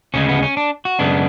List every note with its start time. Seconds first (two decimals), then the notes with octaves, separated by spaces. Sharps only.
0.14 D2 C#3 G#3 C#4
0.29 B3
0.43 C#4
0.57 D4
0.85 F#4
0.99 F#2 C#3 G#3 B3 D4